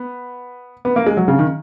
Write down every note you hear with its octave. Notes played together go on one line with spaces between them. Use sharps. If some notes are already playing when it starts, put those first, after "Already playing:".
Already playing: B3
B3
A#3
G#3
F#3
C#3
D#3